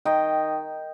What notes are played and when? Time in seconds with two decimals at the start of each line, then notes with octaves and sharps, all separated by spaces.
0.05 D#3 D#5 G5